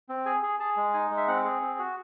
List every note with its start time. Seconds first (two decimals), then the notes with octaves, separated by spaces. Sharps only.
0.09 C4
0.26 G#4 G#5
0.43 G#4
0.60 G#4 A5
0.77 G#3
0.94 D#4 G#5
1.10 G#3
1.17 E5
1.28 C4 F#5
1.45 G#4
1.62 C4
1.79 F#4